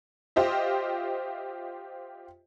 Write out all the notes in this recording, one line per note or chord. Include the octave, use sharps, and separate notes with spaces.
F4 G4 C5 D#5 E5